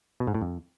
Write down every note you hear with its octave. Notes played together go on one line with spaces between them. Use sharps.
B2
G#2
A2
F2